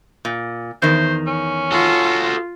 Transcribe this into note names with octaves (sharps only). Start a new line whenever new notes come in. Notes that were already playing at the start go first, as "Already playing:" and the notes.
A#2
E2 D#3 C5
C#4
F4 F#4 A4